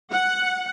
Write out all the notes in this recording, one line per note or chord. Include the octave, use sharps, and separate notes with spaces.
F#5